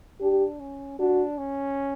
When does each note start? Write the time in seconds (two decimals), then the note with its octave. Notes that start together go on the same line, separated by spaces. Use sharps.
0.21 D4 G4
0.60 C#4
0.99 D4 F#4
1.38 C#4